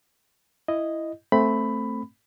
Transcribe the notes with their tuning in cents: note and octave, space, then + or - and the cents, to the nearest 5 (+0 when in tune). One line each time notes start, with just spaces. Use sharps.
E4 +5 D#5 +0
A3 +5 C4 +0 B5 +10